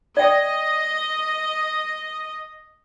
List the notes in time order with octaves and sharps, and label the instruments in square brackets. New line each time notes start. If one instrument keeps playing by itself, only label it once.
[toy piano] D5 G5 [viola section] D#5